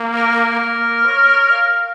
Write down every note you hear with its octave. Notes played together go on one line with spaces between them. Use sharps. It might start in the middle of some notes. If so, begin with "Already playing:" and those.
Already playing: A#3
A#4
A#4
A#3
C#5
F5